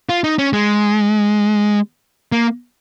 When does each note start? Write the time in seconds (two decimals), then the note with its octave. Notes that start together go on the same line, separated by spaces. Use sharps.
0.09 F4
0.24 D#4
0.38 C#4
0.53 G#3
2.32 A#3